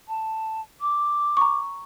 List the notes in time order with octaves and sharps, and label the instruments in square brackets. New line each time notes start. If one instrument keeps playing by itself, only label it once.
[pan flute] A5
D6
[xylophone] A#5 C#6